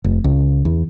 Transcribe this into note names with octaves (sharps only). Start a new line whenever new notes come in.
F1
C#2
E2